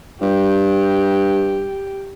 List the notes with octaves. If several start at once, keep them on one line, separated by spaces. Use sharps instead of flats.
G2 G4